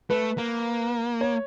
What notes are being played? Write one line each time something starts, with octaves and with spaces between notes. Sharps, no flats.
A3 B4
A#3
C#5